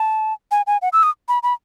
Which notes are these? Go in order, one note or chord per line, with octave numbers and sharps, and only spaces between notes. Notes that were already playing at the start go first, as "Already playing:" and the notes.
Already playing: A5
G#5
G#5
F#5
E6
D#6
B5
B5